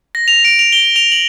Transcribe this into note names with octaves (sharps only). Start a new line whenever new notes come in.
A#6
F7
D7
F7
G7
F7
F#7